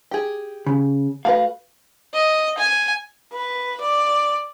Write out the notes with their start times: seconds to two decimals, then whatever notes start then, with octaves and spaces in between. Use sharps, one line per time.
0.11 G4 G#4
0.66 C#3
1.25 A3 F#4 B4 F5
2.14 D#5
2.58 G#5
3.33 B4
3.81 D5